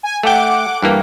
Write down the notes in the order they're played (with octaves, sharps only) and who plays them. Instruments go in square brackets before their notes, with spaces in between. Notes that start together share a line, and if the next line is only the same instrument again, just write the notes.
[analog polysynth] G#5
[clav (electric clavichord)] A3 G5 [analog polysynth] F#5 D6
[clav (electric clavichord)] G2 E3 A#3